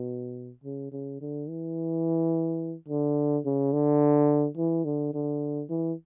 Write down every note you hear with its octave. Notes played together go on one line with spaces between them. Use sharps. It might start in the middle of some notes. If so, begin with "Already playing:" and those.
Already playing: B2
C#3
C#3
D3
E3
D3
C#3
D3
E3
D3
D3
E3